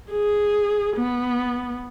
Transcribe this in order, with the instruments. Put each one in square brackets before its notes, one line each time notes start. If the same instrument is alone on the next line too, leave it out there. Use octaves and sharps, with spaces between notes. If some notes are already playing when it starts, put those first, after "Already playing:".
[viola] G#4
B3